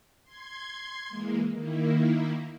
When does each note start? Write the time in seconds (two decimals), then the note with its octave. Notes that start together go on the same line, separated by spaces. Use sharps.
0.24 C6 G#6
1.09 E3 G#3 A#3
1.53 D#3 A#3 E4